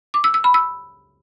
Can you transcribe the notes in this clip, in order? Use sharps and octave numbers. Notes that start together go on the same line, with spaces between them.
D6
E6
E6
B5
E6